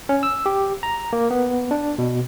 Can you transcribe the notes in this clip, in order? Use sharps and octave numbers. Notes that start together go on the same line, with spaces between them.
C#4
E6
G4
A#5
A#3
B3
D4
B2